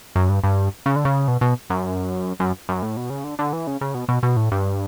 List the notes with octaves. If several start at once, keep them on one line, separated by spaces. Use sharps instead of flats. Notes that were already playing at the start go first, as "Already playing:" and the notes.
F#2
G2
G2
C#3
D3
C#3
B2
B2
F#2
F#2
F#2
A2
B2
C#3
D3
D3
E3
C#3
C#3
B2
B2
B2
A2
G2